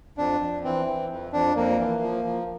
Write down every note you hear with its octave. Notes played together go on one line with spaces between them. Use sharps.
F2 D4
F2
E3 C4
E3
F2
F2 D4
F2 A#3
E3
F3
F3